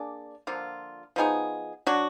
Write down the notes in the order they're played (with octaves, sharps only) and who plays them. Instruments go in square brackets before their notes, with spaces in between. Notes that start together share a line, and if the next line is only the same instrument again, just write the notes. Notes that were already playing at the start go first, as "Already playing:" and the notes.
Already playing: [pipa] A#3 D4 G#4 D5
D3 F3 A#3 F4
F3 B3 D#4 G#4
F#3 D4 F#4